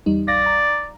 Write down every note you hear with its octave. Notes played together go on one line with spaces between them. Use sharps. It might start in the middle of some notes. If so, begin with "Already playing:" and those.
E2 G3 D#4
A#1 D5 F5 A#6
A#5